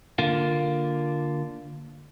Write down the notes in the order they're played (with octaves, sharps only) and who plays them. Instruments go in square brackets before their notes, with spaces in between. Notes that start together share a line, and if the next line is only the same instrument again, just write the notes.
[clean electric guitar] D3 A#3 F4